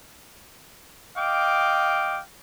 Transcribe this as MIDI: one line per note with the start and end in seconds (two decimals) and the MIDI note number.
1.17 2.20 75
1.17 2.20 77
1.17 2.20 79
1.17 2.20 86